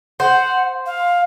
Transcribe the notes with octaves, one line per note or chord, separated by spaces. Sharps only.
C5 F#5
F5